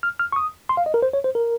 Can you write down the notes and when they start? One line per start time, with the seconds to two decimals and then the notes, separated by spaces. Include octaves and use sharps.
0.03 F6
0.19 F6
0.32 C#6
0.36 D#6
0.69 C6
0.77 F5
0.86 D#5
0.94 A#4
1.02 C5
1.13 C#5
1.24 C5
1.35 A#4